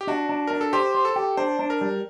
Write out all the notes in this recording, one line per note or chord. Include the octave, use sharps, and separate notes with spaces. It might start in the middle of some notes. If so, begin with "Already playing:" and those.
G4
D4 F#4
D4
D4 A#4
A4
G4 C5
C5
A4
G4
D4 C5
D4
A#4
G3